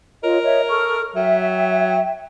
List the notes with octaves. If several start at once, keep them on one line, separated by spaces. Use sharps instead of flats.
F4 A#4 C#5 D#5
C#5 D#5 E5
A4 C#6 F6
F#3 E5 G5